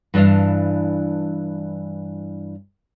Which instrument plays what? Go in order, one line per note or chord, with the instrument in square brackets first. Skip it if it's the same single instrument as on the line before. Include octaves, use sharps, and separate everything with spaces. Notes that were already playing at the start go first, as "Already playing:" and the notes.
[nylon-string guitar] G2 E3 D4 E4 F5